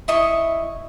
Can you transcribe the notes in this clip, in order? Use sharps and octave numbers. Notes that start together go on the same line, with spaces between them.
E4 D#5 C#6